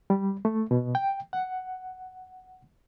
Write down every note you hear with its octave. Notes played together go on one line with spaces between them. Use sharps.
G3
A3
B2
G5
F#5